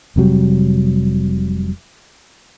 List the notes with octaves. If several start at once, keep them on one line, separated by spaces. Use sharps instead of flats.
F1 C3 F#3 G3